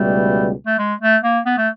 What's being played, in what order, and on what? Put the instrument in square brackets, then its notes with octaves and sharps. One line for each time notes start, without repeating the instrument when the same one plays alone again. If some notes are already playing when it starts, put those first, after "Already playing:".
Already playing: [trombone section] C#2 B2 G3 [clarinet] A3
[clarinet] A3
G#3
A3
A#3
B3
A3